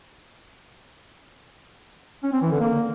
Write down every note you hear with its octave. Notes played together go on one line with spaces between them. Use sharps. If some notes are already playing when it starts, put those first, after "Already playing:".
C#4
C4
E3
D3
A#3